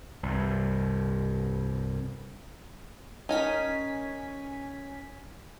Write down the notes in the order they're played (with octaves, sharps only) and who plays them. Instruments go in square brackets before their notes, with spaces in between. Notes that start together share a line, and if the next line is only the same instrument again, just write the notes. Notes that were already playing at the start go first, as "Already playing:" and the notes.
[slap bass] C2 G2
[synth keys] C#4 G#5 B6 [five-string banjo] D#4 A#4